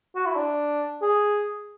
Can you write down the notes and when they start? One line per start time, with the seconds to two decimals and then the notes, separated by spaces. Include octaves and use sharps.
0.15 F#4
0.26 E4
0.36 D4
1.02 G#4